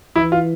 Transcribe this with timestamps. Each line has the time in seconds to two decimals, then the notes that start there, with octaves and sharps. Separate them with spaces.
0.16 E3 E4
0.32 F4